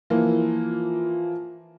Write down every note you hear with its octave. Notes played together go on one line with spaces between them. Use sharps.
E3 F3 A#3